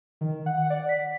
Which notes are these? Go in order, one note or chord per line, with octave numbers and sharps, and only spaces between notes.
D#3
F#5
D5
B6